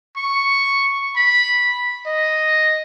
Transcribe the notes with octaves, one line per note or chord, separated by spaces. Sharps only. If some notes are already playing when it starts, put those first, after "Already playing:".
C#6
B5
D#5